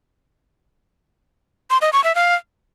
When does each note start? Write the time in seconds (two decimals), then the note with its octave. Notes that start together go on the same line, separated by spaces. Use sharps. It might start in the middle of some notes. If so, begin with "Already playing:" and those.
1.70 C6
1.82 D#5
1.93 C#6
2.04 E5
2.15 F5